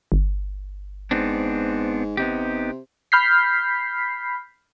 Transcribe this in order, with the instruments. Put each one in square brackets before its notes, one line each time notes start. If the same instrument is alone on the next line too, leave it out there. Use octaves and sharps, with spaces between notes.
[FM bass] G1
[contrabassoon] G#2 [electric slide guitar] B3 C4 D4
[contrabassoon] C3 [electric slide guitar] B3 D#4 G4
[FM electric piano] B5 F6 G6 B6 C7